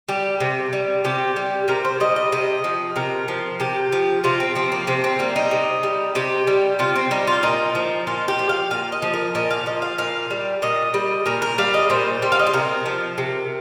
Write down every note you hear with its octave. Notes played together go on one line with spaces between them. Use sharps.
G3 G4
C3
G3
C3 G4
G3
C3 A#4
C5
G3 D#5
D#5
C3 D#5
F3
C3 A#4
F3
C3 G4
F3
C3 F4
C4
F3 C4
A#3
C3 C4
C4
G3 A#3
D#4
C3
G3
C3 G4
G3
C3 F4
C4
G3 D#4
F4
A#2 D#4
F3
A#2 F4
G4
F3
F5
A#2 F5
D#5
F3
A#4
A#2 D#5
F5
F3 D#5
F5
A#2 F5
G3
A#2 D#5
G3 D#5
A#2 A#4
A#4
G3 F5
D#5
A#2 C5
G3
F5
D#5
C5
C3 A#4
F3
C3